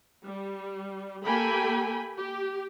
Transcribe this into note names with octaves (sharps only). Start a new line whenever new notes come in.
G3
A#3 G4 A4 G5 G#5 B5
G4